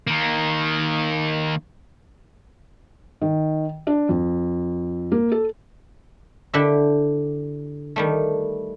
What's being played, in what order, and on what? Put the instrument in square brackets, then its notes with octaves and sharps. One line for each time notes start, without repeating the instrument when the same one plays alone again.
[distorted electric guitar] D#3 A#3
[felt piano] D#3
D4
F2
A#3
A4
[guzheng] D3 D4 E4 G4 E5
D#3 G3 A3